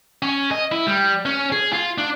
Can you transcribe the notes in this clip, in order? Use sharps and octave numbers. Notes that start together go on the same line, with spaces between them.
C#4
D#5
E4
G3
C#4
G#4
F4
D4